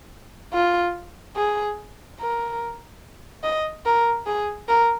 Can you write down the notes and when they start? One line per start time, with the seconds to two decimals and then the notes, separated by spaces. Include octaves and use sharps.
0.53 F4
1.36 G#4
2.20 A#4
3.44 D#5
3.86 A#4
4.26 G#4
4.68 A#4